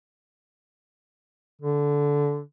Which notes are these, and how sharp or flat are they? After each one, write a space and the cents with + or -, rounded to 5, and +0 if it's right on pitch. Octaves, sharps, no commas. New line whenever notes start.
D3 -15